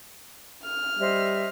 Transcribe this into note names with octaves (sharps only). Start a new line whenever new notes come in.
F6
G3 C5 D#5 E5